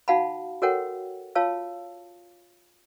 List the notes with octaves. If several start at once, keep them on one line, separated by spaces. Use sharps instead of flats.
D#4 F#4 F5 F#5 A5 B5
F#4 A4 A#4 C#5 F#5 G5
F4 C#5 F5 A5 E6